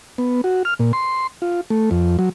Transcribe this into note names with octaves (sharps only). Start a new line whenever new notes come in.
B3
F#4
F6
A#2
C6
F4
A3
F2
F#3